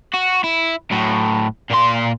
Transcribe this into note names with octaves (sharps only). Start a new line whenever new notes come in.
F#4
E4
A2 F#3
A#2 C6